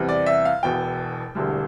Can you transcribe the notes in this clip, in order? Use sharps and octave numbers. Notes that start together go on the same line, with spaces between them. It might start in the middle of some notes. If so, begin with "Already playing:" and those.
Already playing: E2 C3 G3
D5
E5
F5
E1 E2 B2 G5
E1 D2 D3 G3